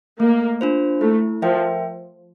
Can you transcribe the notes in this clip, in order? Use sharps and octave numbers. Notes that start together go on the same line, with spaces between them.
A3 A#3
D4 F4 C5
A3 E4
F3 A#4 E5 G5